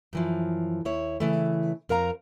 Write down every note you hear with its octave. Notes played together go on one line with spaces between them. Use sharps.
F#2 E3 F3
D#2 E4 C#5
C#3 E3 A3
F2 A#4 F5 A#5